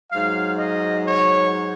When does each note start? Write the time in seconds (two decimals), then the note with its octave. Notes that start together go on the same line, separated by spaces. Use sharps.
0.12 G#2 F#3 F5
0.59 D#5
1.06 C#5